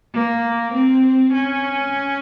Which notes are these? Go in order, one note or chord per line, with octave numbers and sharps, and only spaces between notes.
A#3
C4
C#4